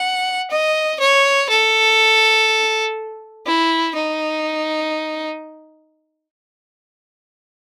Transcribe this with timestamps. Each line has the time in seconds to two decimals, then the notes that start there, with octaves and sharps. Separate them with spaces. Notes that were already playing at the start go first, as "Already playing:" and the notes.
Already playing: F#5
0.51 D#5
1.00 C#5
1.49 A4
3.46 E4
3.95 D#4